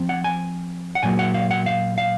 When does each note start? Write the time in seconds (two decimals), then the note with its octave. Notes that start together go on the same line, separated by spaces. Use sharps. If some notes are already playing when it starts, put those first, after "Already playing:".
Already playing: F3 C4
0.09 F#5
0.24 G#5
0.95 F#5
1.03 A#2 F#3 A#3 G#5
1.19 F#5
1.34 F5
1.51 F#5
1.66 F5
1.98 F5